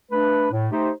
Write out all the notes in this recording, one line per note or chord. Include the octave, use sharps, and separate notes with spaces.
A3 D4 B4
A2
A3 D#4 G4 C5